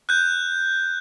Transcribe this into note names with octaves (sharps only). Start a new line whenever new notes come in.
F#6 G6